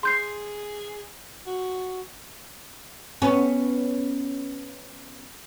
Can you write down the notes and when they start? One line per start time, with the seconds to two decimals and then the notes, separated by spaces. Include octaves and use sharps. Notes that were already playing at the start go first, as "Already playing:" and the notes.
0.03 G#4 C6 G6 C7
1.47 F#4
3.22 B3 C#4